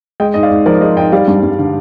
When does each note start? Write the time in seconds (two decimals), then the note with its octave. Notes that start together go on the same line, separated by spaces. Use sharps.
0.20 G#3 D#5 G5
0.34 G#2 D#5
0.43 D5 F5
0.50 G#2
0.66 F3 A#4 D5
0.81 G#3 C5 D#5
0.97 G#2 D#5 G5
1.12 G3 D5 F5
1.28 G2
1.43 G2
1.59 D3